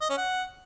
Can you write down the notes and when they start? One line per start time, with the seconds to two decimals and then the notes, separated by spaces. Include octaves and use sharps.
0.01 D#5
0.09 C#4
0.18 F#5